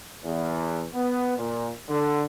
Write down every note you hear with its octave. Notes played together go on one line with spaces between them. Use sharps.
E2
B3
A#2
D3